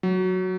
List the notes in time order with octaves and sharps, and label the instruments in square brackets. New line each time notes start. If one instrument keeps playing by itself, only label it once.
[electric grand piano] F#3